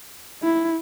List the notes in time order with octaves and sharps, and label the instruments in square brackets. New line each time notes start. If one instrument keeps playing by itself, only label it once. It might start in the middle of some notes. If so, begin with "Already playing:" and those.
[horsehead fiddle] E4